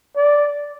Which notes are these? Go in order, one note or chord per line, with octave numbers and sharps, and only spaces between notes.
D5